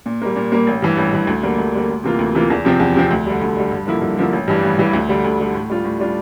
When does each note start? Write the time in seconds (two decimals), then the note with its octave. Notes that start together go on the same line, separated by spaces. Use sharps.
0.06 A#2
0.22 G3 A#3
0.36 A#2
0.52 G3 A#3
0.67 A1
0.82 G2 E3
0.97 A1
1.12 G2 E3
1.27 D2
1.43 D3 G3 A#3
1.58 D2
1.74 D3 G3 A#3
1.89 D2
2.04 C3 E3 A#3 F4
2.19 D2
2.35 C3 E3 A#3 F4
2.50 E2
2.65 C3 F3 C4
2.80 E2
2.96 C3 F3 C4
3.11 D2
3.26 D3 G3
3.41 D2
3.57 D3 G3
3.71 G2
3.87 D3 F3 A#3 E4
4.02 G2
4.17 D3 F3 A#3 E4
4.33 A1
4.48 G2 E3 G3
4.63 A1
4.79 G2 E3 G3
4.93 D2
5.09 D3 G3
5.24 D2
5.40 D3 G3
5.54 A2
5.70 G3 D4 F4
5.85 A2
6.00 G3 D4 F4